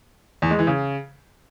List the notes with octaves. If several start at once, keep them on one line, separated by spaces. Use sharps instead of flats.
E2
G#3
E3
C#3